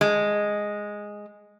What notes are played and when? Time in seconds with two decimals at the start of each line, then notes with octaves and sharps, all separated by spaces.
0.01 G#3